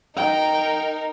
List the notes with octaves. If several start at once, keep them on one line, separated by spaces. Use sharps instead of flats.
D#4 A#4 G5